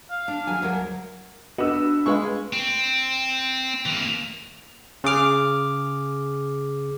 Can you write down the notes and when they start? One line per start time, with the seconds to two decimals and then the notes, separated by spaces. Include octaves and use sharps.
0.10 F5
0.28 D4
0.47 D#2 F#3 G#5
0.62 D2 F#3 A#4
1.58 B3 D4 F#4 D#5 E6
2.06 G#3 F4 B4 F5 C#6
2.53 C4
3.86 E3 A#3
5.04 C#3 G#4 D6 F6